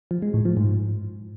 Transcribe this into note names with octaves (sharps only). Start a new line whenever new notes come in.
F3
G#3
A2
F3
G#2